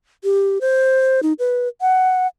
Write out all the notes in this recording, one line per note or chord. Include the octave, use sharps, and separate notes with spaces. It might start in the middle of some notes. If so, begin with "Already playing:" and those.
G4
C5
D#4
B4
F#5